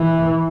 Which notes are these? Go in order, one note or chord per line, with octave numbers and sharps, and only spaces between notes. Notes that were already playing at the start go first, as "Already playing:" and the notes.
Already playing: E3